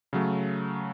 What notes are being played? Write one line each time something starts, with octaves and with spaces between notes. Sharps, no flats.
C#3 F#3 A3